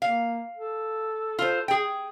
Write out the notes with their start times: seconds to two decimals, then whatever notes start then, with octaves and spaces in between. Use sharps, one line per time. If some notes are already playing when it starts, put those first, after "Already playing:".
0.02 A#3 F5
0.57 A4
1.39 F4 C5
1.68 G#4 G5